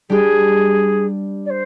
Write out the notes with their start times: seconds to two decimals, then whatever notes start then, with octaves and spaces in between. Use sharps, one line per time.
0.10 G3 D4 G4 G#4
1.45 D5
1.49 C5